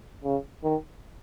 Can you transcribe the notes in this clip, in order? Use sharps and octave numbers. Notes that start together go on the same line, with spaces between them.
C#3
D#3